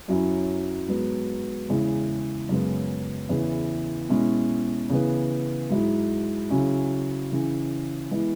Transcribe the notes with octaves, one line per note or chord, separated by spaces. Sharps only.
F#2 F#3 C#4 E4
G#2 F#3 B3
E2 C#3 G#3 E4
F#2 C#3 G#3 B3
E2 C#3 E3 B3 E4
B2 G#3 C#4 E4
C#3 E3 B3
G#2 F#3 E4
C#3 F#3 C#4 E4
C#3 E3 C#4
E3 G#3 B3 E4